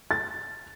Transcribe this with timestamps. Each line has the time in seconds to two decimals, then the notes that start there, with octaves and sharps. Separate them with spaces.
0.11 A6